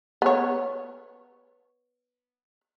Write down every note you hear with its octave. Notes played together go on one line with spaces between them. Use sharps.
B3 C#5